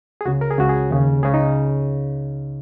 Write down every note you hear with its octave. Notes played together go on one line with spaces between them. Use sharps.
G#4
C#2 C#3 F#4
A#4
G#4
C#2 C#3 F#4
G#4
D#2 C#3
C#2 C#3 G#4
D#4